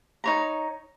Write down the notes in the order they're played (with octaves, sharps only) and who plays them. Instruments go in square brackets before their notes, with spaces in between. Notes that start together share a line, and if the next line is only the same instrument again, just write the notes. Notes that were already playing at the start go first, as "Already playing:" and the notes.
[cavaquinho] D#4 C#5 A#5